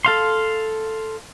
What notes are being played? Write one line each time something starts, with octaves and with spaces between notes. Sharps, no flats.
A4 F5 C6